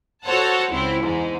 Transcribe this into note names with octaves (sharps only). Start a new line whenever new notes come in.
F#4 A4 C5 C#5 F#5 A5
C#2 C4 E4
E2 G#2